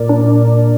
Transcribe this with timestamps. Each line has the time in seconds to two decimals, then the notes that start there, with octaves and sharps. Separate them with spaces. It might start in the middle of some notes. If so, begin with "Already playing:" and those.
Already playing: A#2 A#4 D5
0.09 D4